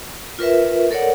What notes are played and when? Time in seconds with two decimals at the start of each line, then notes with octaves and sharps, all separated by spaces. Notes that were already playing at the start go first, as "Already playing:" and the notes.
0.39 F4 A#4 B4 E5
0.91 A4 A#4 C#5 D5 F#5